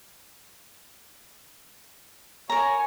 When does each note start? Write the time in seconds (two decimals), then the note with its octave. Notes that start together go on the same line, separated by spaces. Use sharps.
2.50 A#4 C#5 G#5 A#5